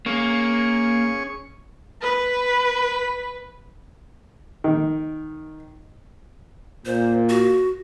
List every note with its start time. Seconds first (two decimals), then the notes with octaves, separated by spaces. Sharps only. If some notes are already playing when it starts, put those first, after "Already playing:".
0.06 A#3 C#4 G#4 C#6
2.02 B4
4.64 D#3
6.86 A#2 C5
7.29 F#4